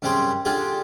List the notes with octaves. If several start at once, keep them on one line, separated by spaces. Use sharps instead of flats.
F#2 C3 G3 G4 G#4 C5
D3 F4 G4 G#4